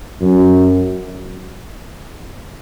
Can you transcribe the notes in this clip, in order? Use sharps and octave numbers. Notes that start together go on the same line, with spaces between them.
F#2